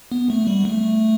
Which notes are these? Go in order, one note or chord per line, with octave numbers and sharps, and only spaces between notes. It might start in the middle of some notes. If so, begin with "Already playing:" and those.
B3
A3
G3
A3